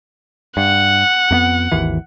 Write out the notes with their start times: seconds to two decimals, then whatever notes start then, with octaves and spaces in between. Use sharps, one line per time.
0.57 G2 F#5
1.31 F2 A#3 B3
1.72 G#1 D#2 E3